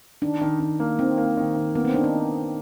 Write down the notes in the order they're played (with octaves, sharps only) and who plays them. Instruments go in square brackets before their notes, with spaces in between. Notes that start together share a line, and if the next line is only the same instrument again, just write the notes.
[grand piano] D#3 [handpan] D4
[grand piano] D#3
D#3
A#3
[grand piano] D#3 [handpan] C4
[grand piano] A#3
D#3
D#3
[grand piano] A#3 [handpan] B3
[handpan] C4
[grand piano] D#3 [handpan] D4
[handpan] D#4